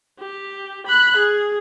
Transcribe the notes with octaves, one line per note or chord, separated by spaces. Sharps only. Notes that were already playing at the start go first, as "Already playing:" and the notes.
G4
B5 F#6
G#4